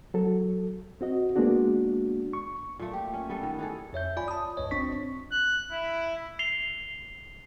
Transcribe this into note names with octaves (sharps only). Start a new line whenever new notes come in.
F#3 A4
C4 F#4 D#5
G#3 A#3 B3 D4 F#4
C#6
A#2 A3
G4
C#4
G3 B3 A4
D#3
E3 G#4 A4
F2 C#5 E5 G6
F4 D5 G#5 B5
A5 D#6
C#2 G2 C#5 D#5
G1 C4 D4 C#6 B6
F#6
E4
C7 F7 G7